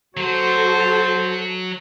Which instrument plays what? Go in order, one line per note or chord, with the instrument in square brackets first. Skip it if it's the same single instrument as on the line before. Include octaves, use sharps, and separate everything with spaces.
[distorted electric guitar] F#3 [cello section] F#4 A4 [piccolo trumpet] C5